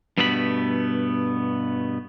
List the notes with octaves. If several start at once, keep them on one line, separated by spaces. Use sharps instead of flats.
G2 B2 A3 B3 B4 B5